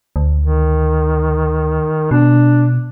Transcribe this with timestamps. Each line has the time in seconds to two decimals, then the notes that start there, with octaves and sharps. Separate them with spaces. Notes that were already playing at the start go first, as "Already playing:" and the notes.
0.16 D2
0.40 D#3
2.11 B2 D4